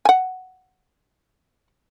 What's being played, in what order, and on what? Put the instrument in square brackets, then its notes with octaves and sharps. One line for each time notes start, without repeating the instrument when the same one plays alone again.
[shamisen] F#5 G#5